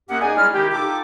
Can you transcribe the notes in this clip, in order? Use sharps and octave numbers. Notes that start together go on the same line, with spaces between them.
F#2 A#3 B3 C#4 G4 F#5
D#4 G#4 D5 D#5 G#5
G3 G#3 C#4 E4 G#4 F6
C3 D#3 D#4 E4 G4
D#4 F4 A4 G5 A5 D6